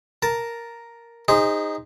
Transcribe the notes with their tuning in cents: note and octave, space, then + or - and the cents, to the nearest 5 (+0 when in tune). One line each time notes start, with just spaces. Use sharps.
A#4 +0 A5 +0
D#4 +0 G#4 -30 C5 +0